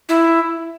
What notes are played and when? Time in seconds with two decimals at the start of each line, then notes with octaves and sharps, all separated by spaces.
0.09 E4